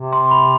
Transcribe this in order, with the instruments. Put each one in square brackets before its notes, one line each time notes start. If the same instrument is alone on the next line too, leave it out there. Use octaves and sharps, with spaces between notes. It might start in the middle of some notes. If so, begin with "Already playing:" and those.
Already playing: [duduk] C3
[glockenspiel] C6
B5